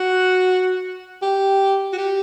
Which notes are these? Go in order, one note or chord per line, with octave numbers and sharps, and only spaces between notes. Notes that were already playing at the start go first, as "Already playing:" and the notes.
Already playing: F#4
G4
F#4
G4